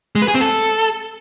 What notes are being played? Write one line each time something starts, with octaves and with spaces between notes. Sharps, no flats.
G#3
B4
G#4
C4
A4